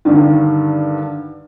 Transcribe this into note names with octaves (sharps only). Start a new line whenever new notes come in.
G2 D3 D#3